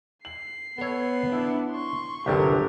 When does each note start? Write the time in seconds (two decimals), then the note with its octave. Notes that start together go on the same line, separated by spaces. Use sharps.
0.25 C7 F#7
0.78 B3 A4 C#5
1.32 D4 E4
1.71 C6 C#6
2.26 G1 C2 D3 F#3 C4 G4 A#4